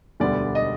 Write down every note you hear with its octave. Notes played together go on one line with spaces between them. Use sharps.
E1 D2 D3 G3 B3 D5
D#5